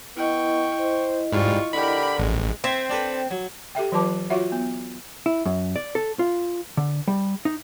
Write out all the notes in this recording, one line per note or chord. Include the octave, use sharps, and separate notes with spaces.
B3 E4 D#5 G5 C#6
C5
G#2 G3 F4 C#6
D3 G4 A#4 B5
A1 G#3
C4 E5 G#5
D4 A4 B4
F#3
G4 A4 E5 G5
E3 F#3 F4 B4 A5 D6
F4 F#4 C#5 E5 F#5
B3
E4
F#2
D5
A4
F4
D3
G3
D#4